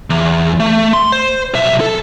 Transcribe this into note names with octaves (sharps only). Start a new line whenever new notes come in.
E2
A3
C6
C5
B1 E5
A4